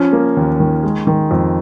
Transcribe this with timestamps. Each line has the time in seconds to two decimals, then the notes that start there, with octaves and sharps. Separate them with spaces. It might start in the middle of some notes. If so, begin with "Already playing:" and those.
Already playing: F3 C#4
0.13 A#3
0.37 D#2
0.60 D#3
0.83 G#3
1.07 D#3
1.31 F2